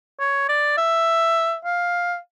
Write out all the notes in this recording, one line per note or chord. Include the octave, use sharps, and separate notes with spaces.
C#5
D5
E5
F5